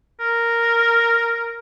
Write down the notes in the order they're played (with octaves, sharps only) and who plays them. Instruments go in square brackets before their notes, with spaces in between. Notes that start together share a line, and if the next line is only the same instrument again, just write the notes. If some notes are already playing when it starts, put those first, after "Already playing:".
[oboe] A#4